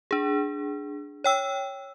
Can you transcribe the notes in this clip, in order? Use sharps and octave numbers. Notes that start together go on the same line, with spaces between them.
D4 G#4
C#5 G5 E6